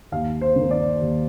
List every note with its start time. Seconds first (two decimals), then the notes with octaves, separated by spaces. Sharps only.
0.12 D#2 F5
0.41 C5
0.56 D#3 A#3
0.71 D5
1.01 D#2